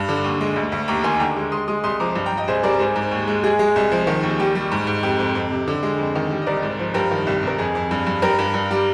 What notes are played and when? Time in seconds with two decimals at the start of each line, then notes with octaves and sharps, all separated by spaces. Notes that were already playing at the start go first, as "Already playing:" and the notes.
Already playing: G2
0.09 D3
0.24 D#2
0.41 G#3
0.56 D2
0.72 D2
0.88 D#2 A#5 D6
1.04 D#3 G#5 C6
1.20 D3 G5 A#5
1.36 G#3
1.52 G#3 C6 D#6
1.68 G#3 C6 D#6
1.84 C2 C6 D#6
2.00 F3 A#5 D6
2.15 G2
2.26 G5 A#5
2.32 G2
2.37 D#5 G5
2.48 C2 G#4 C5
2.63 G3 A#4 D5
2.79 G#2 G#4 C5
2.96 G#2
3.11 D#2
3.27 G#3
3.43 G#3 G#4
3.59 G#3
3.76 C2
3.92 F3
4.07 D#3
4.23 D#2
4.39 G3 G4
4.55 G3
4.72 G#2
4.87 G#2
5.03 F2 G4
5.19 F2
5.35 F2
5.51 C3
5.68 D3
5.83 G#3
5.98 F2
6.15 D#3
6.31 G3
6.42 D#5
6.47 C2 A#4 D5
6.63 G#2
6.79 F3
6.94 G2 G4 A#4
7.11 D#3
7.27 C2
7.43 C2 A#4
7.58 F2 G#4
7.75 F2
7.91 G2
8.07 G2
8.22 G2 G4 A#4
8.39 G2
8.54 G2
8.71 G3